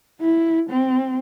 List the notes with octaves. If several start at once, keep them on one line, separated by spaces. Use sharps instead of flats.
E4
C4